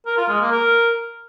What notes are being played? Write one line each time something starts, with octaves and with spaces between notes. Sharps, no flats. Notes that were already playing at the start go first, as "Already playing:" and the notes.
A#4
F4
G#3
A#3
A#4